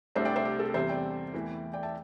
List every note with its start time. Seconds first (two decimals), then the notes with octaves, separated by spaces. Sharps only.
0.16 C2 C3 A3 D4 C5 E5
0.25 D5 G5
0.36 C5 E5
0.45 G4
0.59 A4
0.74 E2 C3 G3 C5 E5
0.89 D5 G5
1.34 E2 E3 A3 E4
1.73 D5 G5
1.83 E5 A5